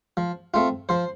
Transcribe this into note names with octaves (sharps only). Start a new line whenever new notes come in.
F3
A3 C4 F4
F3 C5